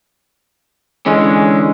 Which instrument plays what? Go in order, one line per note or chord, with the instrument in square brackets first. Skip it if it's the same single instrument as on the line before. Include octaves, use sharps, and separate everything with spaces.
[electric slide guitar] D3 E3 C#4 [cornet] G#3